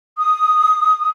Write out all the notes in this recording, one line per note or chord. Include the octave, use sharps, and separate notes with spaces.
D#6